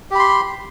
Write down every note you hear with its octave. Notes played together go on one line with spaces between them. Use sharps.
G4 B5 C6